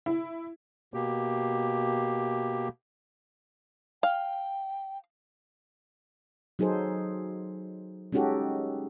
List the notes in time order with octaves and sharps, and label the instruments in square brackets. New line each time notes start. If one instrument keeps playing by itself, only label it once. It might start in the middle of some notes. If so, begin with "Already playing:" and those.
[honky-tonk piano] E4
[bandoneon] B2 A#3 G4
[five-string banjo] F5 [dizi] G5
[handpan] F#3 D#4 G#4 A4 C5
G#3 C#4 D#4 F#4 G4 A4